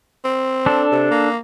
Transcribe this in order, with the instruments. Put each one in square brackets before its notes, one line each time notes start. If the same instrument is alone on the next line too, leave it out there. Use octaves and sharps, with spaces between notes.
[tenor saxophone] C4
[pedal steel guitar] D4 A4
[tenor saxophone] C3
A#3